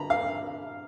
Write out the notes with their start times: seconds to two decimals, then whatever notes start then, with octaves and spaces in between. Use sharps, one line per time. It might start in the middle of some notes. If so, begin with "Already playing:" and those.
Already playing: D3 A#5 B5
0.10 F5